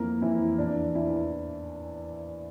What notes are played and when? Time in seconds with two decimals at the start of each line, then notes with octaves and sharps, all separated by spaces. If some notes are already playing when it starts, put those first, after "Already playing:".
Already playing: F2 E3 A#3 A#4
0.21 F2 E3 E4
0.58 E2 E3 D4
0.95 E2 E3 E4